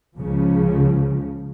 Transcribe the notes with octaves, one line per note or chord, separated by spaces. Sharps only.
C#2 C#3 F3